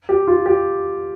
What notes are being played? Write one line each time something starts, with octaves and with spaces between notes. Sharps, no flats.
G4
F4
G4